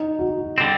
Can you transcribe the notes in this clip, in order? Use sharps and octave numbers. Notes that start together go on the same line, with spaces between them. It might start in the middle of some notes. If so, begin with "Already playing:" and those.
Already playing: D#4
F#4
D3 G3 C4